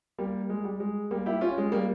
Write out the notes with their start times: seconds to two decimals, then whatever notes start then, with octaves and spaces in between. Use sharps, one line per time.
0.18 G3 A#3
0.50 G#3
0.64 G3
0.80 G#3
1.11 G3 A#3
1.26 E4 G4
1.41 C#4 F4
1.58 G#3
1.72 G3 A#3